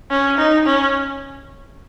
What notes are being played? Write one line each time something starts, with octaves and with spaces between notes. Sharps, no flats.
C#4
D#4
C#4